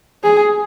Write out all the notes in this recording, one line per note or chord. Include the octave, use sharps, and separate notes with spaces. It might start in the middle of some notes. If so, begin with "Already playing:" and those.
G#4